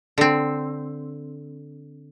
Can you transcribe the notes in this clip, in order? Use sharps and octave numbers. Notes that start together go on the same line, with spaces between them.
D3 C4